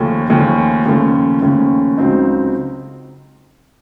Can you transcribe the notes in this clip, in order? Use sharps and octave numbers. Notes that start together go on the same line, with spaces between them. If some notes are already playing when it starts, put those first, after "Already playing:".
Already playing: D#2 C#3 F3 A3 C#4
D#2 C#3 F3 A3 C#4
D#2 C#3 F3 A3 C#4
D#2 C#3 F3 A3 C#4
C#2 C#3 F#3 C4 D#4